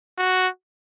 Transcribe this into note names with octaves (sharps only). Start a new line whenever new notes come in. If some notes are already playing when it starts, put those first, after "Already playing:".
F#4